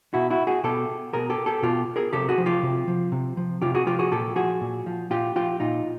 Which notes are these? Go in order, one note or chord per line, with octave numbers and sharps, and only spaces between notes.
B2 E4 F#4
E4 F#4
F#4 G#4
B2 G4 A4
B2 G#4 A#4
G4 A4
G4 A4
B2 F4 G4
G#4 A#4
C3 G4 A4
F#4 G#4
F3
F4 G4
C3
F3
C3
F3
C3 F4 G4
F#4 G#4
F3 F4 G4
F#4 G#4
A#2 G4 A4
F3 F#4 G#4
A#2
F3
A#2 F4 G4
F3 F4 G4
A#2 D#4 F4